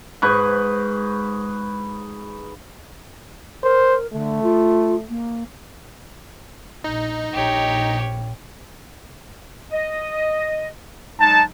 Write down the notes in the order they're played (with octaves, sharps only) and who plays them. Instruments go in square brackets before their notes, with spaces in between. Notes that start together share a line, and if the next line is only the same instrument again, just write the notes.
[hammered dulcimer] G#2 B4 C#6
[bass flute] A#4 [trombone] C5
[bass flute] D3 [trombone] A3
[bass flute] F4
A#3
[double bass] A#1 [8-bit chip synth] D#4
[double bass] A#1 A#2 [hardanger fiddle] G4 C#5
[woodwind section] D#5
[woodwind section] F#3 G#3 D#4 [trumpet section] A5